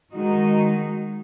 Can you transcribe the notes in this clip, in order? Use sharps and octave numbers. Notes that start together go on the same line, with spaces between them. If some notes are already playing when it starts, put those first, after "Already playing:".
D#3 G#3 D#4 F#4